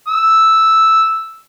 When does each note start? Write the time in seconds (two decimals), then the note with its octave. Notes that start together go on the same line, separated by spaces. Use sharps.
0.08 E6